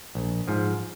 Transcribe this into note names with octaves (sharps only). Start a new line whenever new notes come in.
A#1
G#2 F3